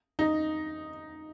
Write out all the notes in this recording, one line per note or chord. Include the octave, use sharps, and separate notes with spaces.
D#4